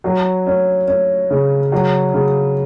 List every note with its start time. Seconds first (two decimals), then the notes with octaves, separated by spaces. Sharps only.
0.04 F#3
0.46 C#4
0.87 C#4
1.31 C#3
1.72 F#3
2.14 C#3